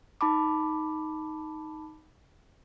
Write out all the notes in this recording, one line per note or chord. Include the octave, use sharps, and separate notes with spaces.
D#4 A5 B5 D6